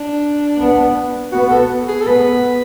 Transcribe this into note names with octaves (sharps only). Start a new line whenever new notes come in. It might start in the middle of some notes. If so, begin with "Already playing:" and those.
Already playing: D4
B3
B3 F#4
A4
G#4
A4
B3 B4